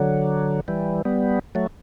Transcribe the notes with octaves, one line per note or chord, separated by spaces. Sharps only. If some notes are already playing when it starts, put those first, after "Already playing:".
Already playing: D3 F#3
E3 G3
G3 B3
F#3 A3